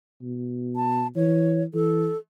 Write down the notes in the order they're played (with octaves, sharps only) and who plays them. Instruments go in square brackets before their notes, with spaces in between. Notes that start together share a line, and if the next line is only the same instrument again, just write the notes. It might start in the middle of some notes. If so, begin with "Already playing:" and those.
[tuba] B2
[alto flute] A5
[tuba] E3 [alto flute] C#5
[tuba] E3 [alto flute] A4